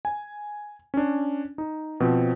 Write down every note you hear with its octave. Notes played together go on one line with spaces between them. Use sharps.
G#5
C#4 D4
D#4
B2 F3 C4